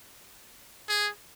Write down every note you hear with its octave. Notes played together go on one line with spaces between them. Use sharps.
G#4